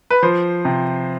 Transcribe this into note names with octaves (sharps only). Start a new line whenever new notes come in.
B4
F3 C5
C3